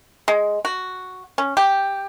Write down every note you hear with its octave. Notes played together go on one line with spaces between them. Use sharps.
G#3
F#4
C#4
G4